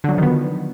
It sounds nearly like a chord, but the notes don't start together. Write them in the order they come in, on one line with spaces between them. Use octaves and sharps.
D3 F#3 F3 D#3 B3